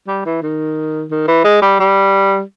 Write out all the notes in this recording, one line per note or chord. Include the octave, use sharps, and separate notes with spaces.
G3
E3
D#3
D#3
E3
G#3
G3
G3